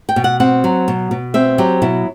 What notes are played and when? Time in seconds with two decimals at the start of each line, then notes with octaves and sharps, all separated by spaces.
0.09 G5
0.16 B2
0.24 F#5
0.40 C4 F#5
0.64 F#3
0.88 B2
1.11 B2
1.34 C4 E5
1.58 F#3 G4
1.82 B2 E4